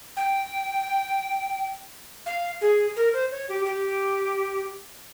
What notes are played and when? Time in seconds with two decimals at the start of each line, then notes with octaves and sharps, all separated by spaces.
0.17 G5
2.26 F5
2.61 G#4
2.96 A#4
3.14 C5
3.31 C#5
3.49 G4
3.66 G4